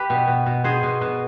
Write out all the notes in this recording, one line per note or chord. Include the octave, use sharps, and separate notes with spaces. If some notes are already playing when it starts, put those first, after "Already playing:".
Already playing: G4 B4
B2
B2
B2
B2 G#4 C5
B2
B2